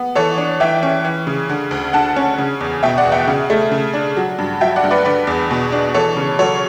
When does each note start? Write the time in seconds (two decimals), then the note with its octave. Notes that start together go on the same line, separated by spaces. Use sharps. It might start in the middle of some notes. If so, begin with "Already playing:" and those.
Already playing: B3
0.15 E3 A4 C#5
0.38 D4
0.60 E3 E5 G5
0.83 C#4
1.04 E3
1.27 C#3
1.49 D3
1.71 D2
1.93 D3 F#5 A5
2.16 C#4
2.38 C#3
2.61 E2
2.83 B2 E5 G5
2.98 D5 F#5
3.05 E2
3.12 E5 G5
3.27 C#3
3.50 A3
3.72 C#3
3.94 D4
4.17 F#3
4.38 G2
4.61 F#3 E5 G5
4.76 D5 F#5
4.84 G2
4.91 B4 D5
5.05 D3 B4 D5
5.27 E2
5.51 B2
5.72 D4
5.94 E3 A4 C#5
6.17 C#3
6.39 F#3 A4 C#5